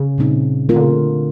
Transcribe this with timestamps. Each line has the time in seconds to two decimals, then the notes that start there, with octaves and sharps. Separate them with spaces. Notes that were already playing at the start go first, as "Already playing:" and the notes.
Already playing: C#3
0.18 A#2 G3 C4 D#4
0.68 D#3 A3 C4 F4 A#4
0.76 D3
0.83 C#3
0.92 D3